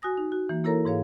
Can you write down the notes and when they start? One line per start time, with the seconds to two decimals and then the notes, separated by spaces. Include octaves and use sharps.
0.02 F#4 G#5 D#6 A#6
0.17 D#4
0.32 F#4
0.49 E3 A#3
0.64 A#3 E4 A4 A#4 C#5 A#5
0.85 G#2 G#4 C#5 F5